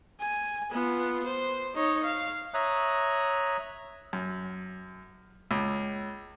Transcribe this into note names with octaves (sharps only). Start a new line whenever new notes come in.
G#5
B3 F4
C5
D#4 C#5
F5
C#5 E5 A#5 D#6 F#6
F#2
C#2